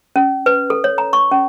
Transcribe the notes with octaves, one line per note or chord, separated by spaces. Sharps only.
C#4
B4
A4
C#5
A#5
C#6
C#4